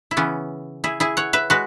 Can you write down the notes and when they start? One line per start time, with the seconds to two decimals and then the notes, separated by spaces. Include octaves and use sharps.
0.11 E4
0.17 C#3 E3 B3 C#4
0.84 E4 G#4
1.00 E4 G#4
1.17 C#5 F#5
1.33 B4 E5
1.50 G#3 F#4 B4